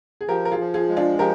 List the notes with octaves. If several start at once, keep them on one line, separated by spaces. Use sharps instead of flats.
G#4
F3 G4 A#4
A#4
F4 G#4
F3
F4 G#4
G#3
D4 F4
F3 G4 A#4